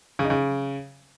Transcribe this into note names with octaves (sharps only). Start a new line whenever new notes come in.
C#3
D#4
C#3